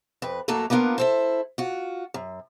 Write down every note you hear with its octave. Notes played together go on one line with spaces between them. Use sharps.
F2 B4
F#2 F#3 A3 A#3 A4 A#5
A#3 B3 D4 F4 A#4
E4 A4 C5
F4 F#4
F#2